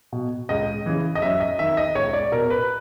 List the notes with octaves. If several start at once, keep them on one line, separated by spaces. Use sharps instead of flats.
B2
C#2 D#5
C#3 E3
D#5
F#2 E5
D#5
D#3 E5
D#5
C#2 C#5
D5
B2 A#4
B4